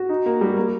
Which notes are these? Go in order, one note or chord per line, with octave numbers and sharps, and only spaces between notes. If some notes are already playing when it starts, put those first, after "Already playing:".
Already playing: F#4
D#4
A#3
G3
A#3